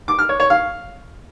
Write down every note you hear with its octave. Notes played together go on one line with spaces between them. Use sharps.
D6
F6
C#5
C#5
F5